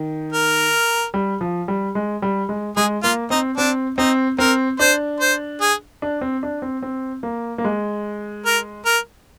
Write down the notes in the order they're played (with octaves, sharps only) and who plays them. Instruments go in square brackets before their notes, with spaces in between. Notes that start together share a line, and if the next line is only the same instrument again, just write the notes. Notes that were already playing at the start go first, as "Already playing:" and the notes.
Already playing: [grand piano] D#3
[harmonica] A#4
[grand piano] G3
F3
G3
G#3
G3
G#3
[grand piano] G#3 [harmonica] G#4
[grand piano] A#3 [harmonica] F4
[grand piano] C4 [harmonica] D#4
[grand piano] C4 [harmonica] D4
[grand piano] C4 [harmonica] D#4
[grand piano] C4 [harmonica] A#4
[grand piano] D4 [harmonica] C5
[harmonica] C5
G#4
[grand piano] D4
C4
D4
C4
C4
A#3
A#3
G#3
[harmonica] A#4
A#4